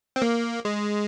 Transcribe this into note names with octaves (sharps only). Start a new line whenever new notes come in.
C4
A#3
G#3